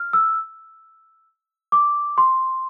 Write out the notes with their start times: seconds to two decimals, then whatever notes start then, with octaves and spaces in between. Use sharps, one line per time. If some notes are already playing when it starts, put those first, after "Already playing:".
Already playing: F6
0.13 E6
1.72 D6
2.18 C6